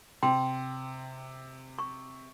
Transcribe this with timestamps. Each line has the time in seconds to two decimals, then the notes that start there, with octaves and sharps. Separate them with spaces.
0.23 C3 G5 C6
1.79 C#6